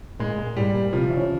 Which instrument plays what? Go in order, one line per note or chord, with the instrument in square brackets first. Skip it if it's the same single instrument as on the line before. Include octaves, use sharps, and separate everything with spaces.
[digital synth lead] A#2 [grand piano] G#3
[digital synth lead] A#2
[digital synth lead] G#2 [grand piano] G3
[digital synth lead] A#2
[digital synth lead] C3 [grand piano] F3
[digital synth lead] E3
C#3